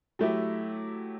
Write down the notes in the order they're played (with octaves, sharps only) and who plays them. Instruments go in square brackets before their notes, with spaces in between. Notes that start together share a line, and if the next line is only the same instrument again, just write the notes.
[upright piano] F#3 A3 E4 G4